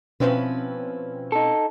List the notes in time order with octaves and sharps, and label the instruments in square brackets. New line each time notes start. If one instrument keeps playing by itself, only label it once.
[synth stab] B2 C4 C#4 [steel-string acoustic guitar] F3 E4 B4
[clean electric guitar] D#4 A4